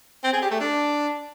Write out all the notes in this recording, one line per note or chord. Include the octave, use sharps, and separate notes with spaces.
C4
G#4
G4
A3
D4